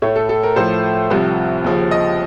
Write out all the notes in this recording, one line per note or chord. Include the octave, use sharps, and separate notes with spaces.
A2 A3 C#5
A4
A4
A#4
A2 F3 A3 C5
C2 C3 F3
D#2 C#3 F3
D#5